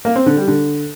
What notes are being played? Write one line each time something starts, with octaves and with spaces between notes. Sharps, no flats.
A#3
C4
D3
G3
D3